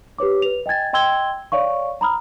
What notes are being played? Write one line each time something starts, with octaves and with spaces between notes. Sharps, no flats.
G4 B4 C#5 D6
B4 F7
D#5 G5 G#5 G#6 A6
D#5 G5 C6 E6 G#6 G7
C#5 D5 F5 C#6
A#5 B5 D#6 F6